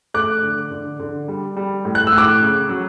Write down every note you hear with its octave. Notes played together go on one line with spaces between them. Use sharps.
A3 D6 F#6
D3
D3
D3
G3
G3
A2
F#6
E6
A2
D6 F#6
C#3
F#3